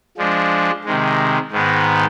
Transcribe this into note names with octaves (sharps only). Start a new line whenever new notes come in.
F3 G#3 D4
C3 D#3 G#3
G#2 D#3 G#3 B3